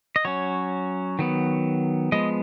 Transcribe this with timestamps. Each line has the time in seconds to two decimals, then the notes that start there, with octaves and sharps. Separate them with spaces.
0.16 D#5
0.25 F#3 C#4 C#5
1.19 D#3 F#3 B3
2.12 F3 G#3 B3 D#5